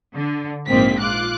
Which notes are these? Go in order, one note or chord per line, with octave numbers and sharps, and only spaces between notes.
D3
A#1 G#2 A#3 C4 B6
F4 D6 F#6